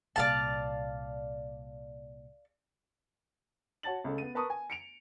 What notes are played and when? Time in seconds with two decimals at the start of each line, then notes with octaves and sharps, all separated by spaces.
0.16 C2 A#2 D5 F5 A5
3.83 F#4 C#5 A5 A6 F#7
4.04 C#2 A3 C#4
4.18 B3 D#7
4.35 A#4 B4 A5 A#5 C#6 D#6
4.50 G#5
4.70 C#7 D7 F7